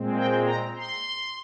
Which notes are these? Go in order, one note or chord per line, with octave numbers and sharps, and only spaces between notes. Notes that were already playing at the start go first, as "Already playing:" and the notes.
Already playing: A#2 G#3 C4
G5
A#5
C6